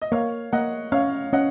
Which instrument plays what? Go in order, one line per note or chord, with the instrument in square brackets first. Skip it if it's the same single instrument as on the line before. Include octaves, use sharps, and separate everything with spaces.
[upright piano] D#5
[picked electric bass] A#3 [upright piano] C#5 F5
[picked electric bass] A#3 [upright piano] D#5 F#5
[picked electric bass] C#4 [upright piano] C#5 F5
[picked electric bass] C#4 [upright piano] D#5 F#5